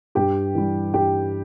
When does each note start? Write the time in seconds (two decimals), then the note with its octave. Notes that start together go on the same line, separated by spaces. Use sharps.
0.15 G2 G4 G5
0.55 E3 G3
0.94 G2 G4 G5